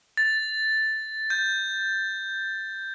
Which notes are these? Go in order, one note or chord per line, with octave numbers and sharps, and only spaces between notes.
A6
G6